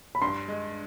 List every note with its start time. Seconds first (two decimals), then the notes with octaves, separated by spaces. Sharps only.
0.15 B5
0.22 G2 C6
0.48 G#3